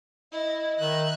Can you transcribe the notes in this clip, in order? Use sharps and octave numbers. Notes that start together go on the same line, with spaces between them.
E4 D#5
D#3 E5 F#6